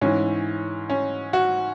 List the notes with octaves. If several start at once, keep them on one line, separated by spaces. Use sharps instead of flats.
G#2 E3 C#4
C#4
F#4